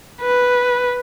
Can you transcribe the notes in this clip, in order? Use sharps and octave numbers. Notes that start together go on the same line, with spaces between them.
B4